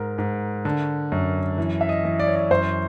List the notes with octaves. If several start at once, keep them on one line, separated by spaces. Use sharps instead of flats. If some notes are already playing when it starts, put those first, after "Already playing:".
Already playing: G#2 A#4
G#2
D3
F#2
E3
E5
D#5
E3
D5
C#5
D5
F#2 C5